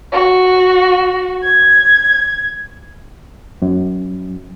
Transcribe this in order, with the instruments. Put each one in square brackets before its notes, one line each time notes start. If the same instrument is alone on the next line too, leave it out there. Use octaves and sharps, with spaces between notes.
[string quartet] F#4
G#6
[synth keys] F#2